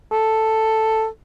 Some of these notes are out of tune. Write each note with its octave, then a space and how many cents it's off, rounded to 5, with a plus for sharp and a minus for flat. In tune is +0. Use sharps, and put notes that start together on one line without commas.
A4 +5